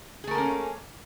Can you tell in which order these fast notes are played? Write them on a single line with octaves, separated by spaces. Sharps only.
G#4 A3 A#4 A#3 C#4